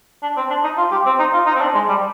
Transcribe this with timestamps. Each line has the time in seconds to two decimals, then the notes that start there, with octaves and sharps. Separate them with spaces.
0.23 D4
0.37 C4
0.50 D4
0.64 D#4
0.77 F4
0.92 G4
1.06 C4
1.19 D#4
1.34 F4
1.47 D#4
1.55 C4
1.61 D4
1.75 G#3
1.88 G3